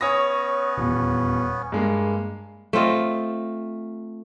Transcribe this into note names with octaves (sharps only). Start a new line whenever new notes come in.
B3 C#4 C#5 D#6 A#6
D#1 E2
G2 G#3 A#3
A3 C4 F4 D#5